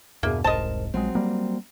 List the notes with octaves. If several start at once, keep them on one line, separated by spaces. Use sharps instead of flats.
E2 G2 B2 A#3 G#4 E5
E1 C2 G#2 A#4 C5 D#5 A5
A#1 F#3 G#3 C4
G3 A#3